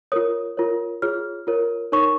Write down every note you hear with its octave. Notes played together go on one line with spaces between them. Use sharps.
F4 A#4 C#5 D#6
F4 A#4 C#5
F4 G#4 C#5 F6
F4 A#4 C#5
D#4 A#4 C#5 C#6